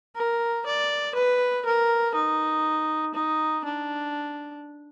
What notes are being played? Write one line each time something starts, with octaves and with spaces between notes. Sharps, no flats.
A#4
D5
B4
A#4
D#4
D#4
D4